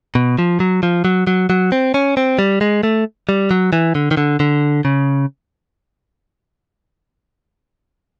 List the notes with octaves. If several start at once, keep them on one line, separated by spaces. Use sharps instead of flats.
B2
F3
F#3
F3
F#3
F#3
F#3
C4
C#4
C4
G3
G#3
A3
G3
F#3
E3
D3
D#3
D3
D3
C#3